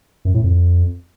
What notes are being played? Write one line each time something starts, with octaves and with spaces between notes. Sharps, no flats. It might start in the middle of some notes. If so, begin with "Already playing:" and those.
F#2
A2
F2